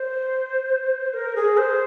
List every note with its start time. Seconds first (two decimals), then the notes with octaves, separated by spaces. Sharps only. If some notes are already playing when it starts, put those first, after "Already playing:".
Already playing: C5
1.14 A#4
1.36 G#4
1.57 C5